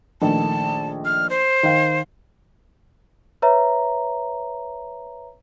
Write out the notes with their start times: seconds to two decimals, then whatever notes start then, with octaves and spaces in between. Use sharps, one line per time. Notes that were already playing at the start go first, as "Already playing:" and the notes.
0.22 A#1 D#3 A3 A5
1.05 F6
1.30 C5
1.63 D#3 F5
3.42 B4 C#5 E5 A#5